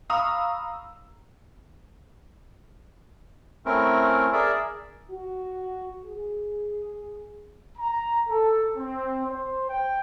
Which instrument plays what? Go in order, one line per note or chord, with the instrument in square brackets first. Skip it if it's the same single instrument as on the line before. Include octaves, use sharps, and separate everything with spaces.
[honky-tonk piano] F5 A#5 B5 C#6 D#6 E6
[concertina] A3 C4 C#4 E4 A#4
G#4 A#4 D5 E5
[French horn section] F#4
G#4
[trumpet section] A#5
A4
C4
C5
G5